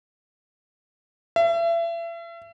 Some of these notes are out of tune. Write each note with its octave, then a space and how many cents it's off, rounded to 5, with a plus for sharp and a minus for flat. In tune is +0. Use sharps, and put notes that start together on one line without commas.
E5 +35